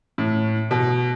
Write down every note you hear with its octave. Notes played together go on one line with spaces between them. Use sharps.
A2
B2